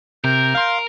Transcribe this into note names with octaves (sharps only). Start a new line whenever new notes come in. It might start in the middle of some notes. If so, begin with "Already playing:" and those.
C3 A#4 G6
F5 C6